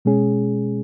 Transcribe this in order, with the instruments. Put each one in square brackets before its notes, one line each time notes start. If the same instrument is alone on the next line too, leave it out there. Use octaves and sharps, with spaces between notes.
[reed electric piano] B2 G#3 C#4 G#4